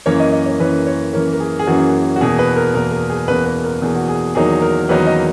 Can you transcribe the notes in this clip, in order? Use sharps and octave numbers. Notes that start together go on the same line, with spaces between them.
F#2 E3 A#3 C#4 C#5
D#5
D#5
C#5
F#2 E3 A#3 C#4 B4
C#5
F#2 E3 A#3 C#4 A#4
A#4
G#4
G#4
F#2 E3 A#3 C#4 F#4
F#4
E2 B2 A#3 G#4
B4
A#4
E2 B2 A#3 A#4
A#4
G#4
E2 B2 A#3 B4
B4
A#4
E2 B2 A#3 G#4
F#4
G#4
E2 D#3 F#3 A#3 D#4 G#4
A#4
E2 D#3 F#3 A#3 D#4 B4
D#5